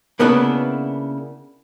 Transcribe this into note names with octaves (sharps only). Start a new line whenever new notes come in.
C#3 A#3 B3 D4 E4 B4